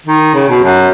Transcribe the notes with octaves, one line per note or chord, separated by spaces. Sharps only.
D#3
C#3
B2
F#2